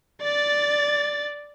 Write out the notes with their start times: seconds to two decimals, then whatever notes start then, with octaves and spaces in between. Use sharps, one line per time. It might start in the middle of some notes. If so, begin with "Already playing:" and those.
0.22 D5 A6